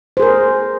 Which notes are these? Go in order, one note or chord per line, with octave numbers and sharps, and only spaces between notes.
G#4 A#4 C5